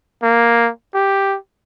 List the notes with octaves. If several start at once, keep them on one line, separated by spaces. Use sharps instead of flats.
A#3
G4